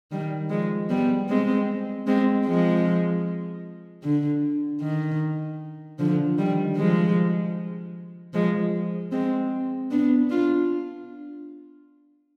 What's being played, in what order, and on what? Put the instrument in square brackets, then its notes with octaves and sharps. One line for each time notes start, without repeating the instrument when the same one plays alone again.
[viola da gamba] D#3 G3
F3 G#3
G3 B3
G#3 C4
G#3 C4
F3 G#3
D3
D#3
D3 F3
D#3 G3
F3 G#3
F3 G#3
G#3 C4
B3 D4
D4 F4